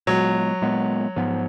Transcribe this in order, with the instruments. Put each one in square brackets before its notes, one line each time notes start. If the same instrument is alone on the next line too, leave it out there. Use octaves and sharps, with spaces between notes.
[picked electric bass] A#2 G#3 B3 [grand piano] F#3
[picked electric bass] A#2 G#3 B3
G#2 F3 B3